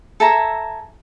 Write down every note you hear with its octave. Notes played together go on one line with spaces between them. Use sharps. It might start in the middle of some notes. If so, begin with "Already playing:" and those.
A4 E5 G#5 A#5